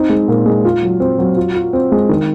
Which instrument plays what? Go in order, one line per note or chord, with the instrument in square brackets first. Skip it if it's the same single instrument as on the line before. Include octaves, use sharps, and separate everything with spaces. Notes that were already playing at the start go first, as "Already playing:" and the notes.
Already playing: [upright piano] C4 D#4
G#3
A#2
G#3
F4
F#3
C4
F#3
F4
F4
C4
G#3
D#3